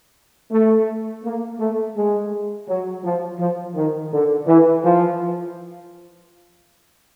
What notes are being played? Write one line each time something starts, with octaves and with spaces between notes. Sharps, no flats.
A3
A#3
A3
G#3
F#3
F3
F3
D#3
D3
E3
F3